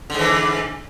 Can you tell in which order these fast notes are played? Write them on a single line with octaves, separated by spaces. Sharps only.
D3 G#2 E3